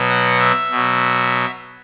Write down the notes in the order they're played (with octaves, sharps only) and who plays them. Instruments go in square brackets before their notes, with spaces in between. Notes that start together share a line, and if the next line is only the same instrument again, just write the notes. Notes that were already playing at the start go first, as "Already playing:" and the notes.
Already playing: [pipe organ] B2 F#3
F#5
E5
B2 F#3